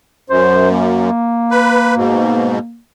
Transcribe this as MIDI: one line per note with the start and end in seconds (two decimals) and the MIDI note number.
0.30 1.10 42
0.30 0.70 72
0.70 2.79 58
1.51 1.95 71
1.97 2.59 44
1.97 2.59 47